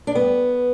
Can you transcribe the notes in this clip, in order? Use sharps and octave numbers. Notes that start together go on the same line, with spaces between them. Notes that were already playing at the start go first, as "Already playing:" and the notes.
D4
G2 B3